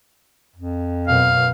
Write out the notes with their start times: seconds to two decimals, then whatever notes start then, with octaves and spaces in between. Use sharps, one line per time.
0.56 F2
1.08 F#2 B2 F5